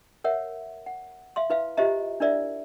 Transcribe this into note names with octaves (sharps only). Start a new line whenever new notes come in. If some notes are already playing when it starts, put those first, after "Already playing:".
A#4 C#5 E5 F#5
F#5
E5 F5 C6
E4 B4 E5 F5
F4 G4 C5 D#5 E5 A#5
D4 E4 A#4 D5 E5